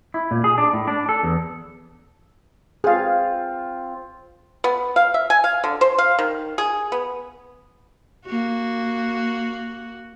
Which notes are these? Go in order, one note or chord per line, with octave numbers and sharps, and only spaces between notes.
E4
A#2
G#4
D4
A2
D4
A4
E2
C4 F4 G#4 F5
B3
F5
E5
G#5
F5
D3
C5
F5
D#3
G#4
B3
A#3 F#4